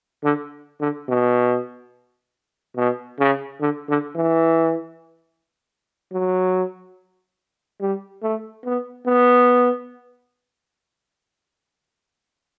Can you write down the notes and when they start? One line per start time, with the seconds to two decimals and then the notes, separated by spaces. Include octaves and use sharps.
0.24 D3
0.80 D3
1.09 B2
2.76 B2
3.19 C#3
3.61 D3
3.89 D3
4.16 E3
6.13 F#3
7.80 G3
8.22 A3
8.64 B3
9.07 B3